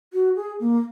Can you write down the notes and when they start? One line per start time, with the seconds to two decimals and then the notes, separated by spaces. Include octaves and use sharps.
0.13 F#4
0.36 G#4
0.60 A#3